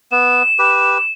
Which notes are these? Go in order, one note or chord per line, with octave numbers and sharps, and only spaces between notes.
B3 E7
G4 B4